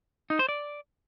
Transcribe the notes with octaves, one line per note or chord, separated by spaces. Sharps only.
D#4
C5
D5